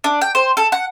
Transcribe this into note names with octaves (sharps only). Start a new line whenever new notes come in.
D4
G5
C5
A4
F#5